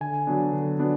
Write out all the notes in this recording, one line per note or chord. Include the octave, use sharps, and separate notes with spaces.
D3 G#5
F#3 B3 D4
D3
F#3 B3 D4